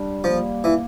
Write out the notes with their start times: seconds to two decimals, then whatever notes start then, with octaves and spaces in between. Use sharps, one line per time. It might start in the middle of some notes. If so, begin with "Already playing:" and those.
Already playing: G3 D4
0.24 F3 A#3
0.64 E3